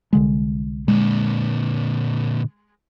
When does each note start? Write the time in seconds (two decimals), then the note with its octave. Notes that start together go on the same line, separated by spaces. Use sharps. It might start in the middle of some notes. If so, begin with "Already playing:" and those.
0.13 C2 D3 G#3
0.88 A#2 D3 G#3